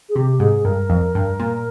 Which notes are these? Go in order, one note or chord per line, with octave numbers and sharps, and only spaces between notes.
G#4
C3 G4
G#2 G#4
G2 A#4
F2
G2
A#2